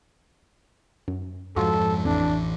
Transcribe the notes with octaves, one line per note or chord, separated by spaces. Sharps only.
F#2
F2 G#2 F3 F4 F#4 A4
A1 F2 E3 D4